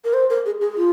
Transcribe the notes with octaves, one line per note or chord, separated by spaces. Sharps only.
A#4
C5
A#4
G#4
G#4
F4